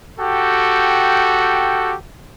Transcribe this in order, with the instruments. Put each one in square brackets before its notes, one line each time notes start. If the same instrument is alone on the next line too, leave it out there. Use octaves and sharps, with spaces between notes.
[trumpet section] F#4 G4 A4 G5